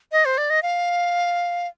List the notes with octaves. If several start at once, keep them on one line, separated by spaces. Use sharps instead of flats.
D#5
C5
D5
D#5
F5